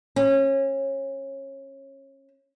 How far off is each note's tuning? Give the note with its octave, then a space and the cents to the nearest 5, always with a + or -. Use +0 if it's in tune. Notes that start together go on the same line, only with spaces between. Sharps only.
C#4 -25